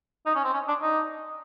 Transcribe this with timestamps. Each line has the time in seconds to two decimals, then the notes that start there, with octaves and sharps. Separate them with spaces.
0.26 D#4
0.35 C#4
0.44 C4
0.53 C#4
0.68 D4
0.82 D#4